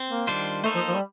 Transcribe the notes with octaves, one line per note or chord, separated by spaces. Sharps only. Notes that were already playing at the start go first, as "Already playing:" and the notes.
Already playing: C4
A#3
D#3 G3 D4 F4 C5
A3 A#3 D#4 A4 C5
F3
F3
G3